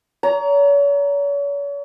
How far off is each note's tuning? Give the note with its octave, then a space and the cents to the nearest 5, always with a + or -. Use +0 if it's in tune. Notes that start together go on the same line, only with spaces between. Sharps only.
C#5 +40 A#5 +0